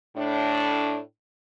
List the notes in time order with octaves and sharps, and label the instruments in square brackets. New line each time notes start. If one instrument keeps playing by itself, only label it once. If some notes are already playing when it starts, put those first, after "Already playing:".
[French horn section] A2 D4